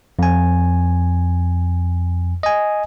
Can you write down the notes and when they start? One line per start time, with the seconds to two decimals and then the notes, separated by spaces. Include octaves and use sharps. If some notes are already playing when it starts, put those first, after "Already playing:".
0.19 F2 G#5
2.43 D#5 G#5